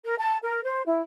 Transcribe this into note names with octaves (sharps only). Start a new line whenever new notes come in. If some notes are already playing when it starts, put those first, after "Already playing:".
A#4
A5
A#4
C5
E4